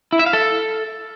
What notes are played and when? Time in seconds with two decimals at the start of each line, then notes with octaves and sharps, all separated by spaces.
0.13 E4
0.19 E5
0.26 F5
0.33 A4